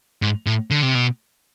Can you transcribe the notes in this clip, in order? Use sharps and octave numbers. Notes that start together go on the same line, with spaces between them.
G#2
A2
D3
C3
B2